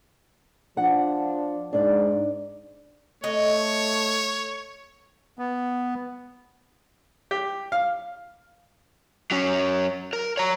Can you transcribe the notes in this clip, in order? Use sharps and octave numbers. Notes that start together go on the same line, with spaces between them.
F3 D4 F#5
G#2 D4 D5
A3 C#5 D#5
B3
G4
F5
F#3 C#4
A#4
C#5 A#5